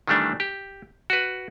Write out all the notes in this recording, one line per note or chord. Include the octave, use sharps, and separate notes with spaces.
D#3 E3 G3 A3 D4
G4
F#4 B4